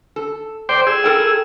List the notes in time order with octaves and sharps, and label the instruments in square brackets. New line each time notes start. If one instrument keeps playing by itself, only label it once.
[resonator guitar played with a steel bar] A4
[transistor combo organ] C5 D5 G5
G#4 E6
[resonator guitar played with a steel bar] A4 A#4 G5